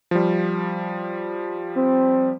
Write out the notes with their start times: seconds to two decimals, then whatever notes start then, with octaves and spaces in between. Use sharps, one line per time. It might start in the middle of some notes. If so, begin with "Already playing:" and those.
0.11 F3 G3
1.76 C4